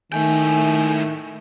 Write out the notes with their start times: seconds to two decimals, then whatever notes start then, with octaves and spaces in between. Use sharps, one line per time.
0.12 A2 D#3 A3 G5 G#5